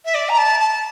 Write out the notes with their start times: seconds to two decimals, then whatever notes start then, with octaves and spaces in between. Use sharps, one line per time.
0.05 E5
0.14 D5
0.29 A#5
0.37 A5
0.60 A5